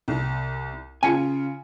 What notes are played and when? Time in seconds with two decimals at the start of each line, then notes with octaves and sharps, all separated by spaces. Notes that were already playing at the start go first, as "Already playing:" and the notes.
0.08 C2
1.03 C#3 F4 G#5 C#7